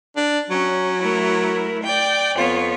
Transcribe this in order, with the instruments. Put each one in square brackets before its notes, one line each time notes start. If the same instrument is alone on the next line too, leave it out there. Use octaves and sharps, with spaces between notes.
[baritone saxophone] D4
[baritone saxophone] F#3 [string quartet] C#4
[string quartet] A3 E4 A#4
D5 G5
[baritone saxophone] F2 [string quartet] B3 F4 C#5